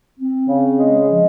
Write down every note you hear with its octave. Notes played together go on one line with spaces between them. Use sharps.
C4
C#3
G#3
F3